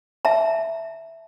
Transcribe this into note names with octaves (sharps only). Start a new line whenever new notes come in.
E5 A5 A#5